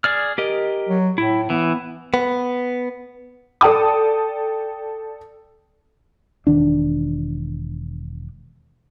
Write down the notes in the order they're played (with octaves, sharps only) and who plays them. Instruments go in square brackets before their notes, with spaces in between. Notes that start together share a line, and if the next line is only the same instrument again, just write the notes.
[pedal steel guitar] G#4 D5 F6
G4 A#4 D#5
[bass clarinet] F#3
[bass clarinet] A2 [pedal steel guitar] E4
[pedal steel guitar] E3 [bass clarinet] B3
[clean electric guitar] B3
[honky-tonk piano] A4 D5 G5 A5 D#6
[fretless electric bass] E1 E2 D#3 D4